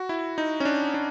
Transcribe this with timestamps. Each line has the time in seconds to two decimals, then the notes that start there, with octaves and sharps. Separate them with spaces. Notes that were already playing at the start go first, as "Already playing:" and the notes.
Already playing: F#4
0.09 E4
0.38 D#4
0.60 C#4
0.65 D4
0.94 D4